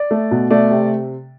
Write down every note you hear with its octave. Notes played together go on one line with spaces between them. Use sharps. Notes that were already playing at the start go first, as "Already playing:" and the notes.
Already playing: D5
A3
B2
A3 D5
C3